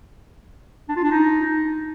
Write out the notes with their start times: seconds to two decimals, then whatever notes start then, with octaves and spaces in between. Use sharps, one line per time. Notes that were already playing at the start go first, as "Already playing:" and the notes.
0.89 D4
0.96 F4
1.04 D4
1.11 D#4